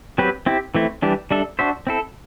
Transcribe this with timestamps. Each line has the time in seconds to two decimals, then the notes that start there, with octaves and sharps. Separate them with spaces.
0.18 F#3 C4 G4 B4
0.46 C4 E4 G4
0.75 E3 A3 C4 E4
1.02 E3 G3 D4 G4
1.31 G3 D4 A4 E5
1.59 D4 F#4 C5 E5
1.87 C4 E4 A4